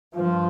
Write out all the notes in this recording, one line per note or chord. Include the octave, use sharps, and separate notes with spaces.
G2 F3